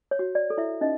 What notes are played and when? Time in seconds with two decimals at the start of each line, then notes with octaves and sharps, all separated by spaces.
0.11 C#5
0.19 F#4
0.35 D5
0.50 A4
0.57 E4 E5
0.81 C#4 D#4 D#5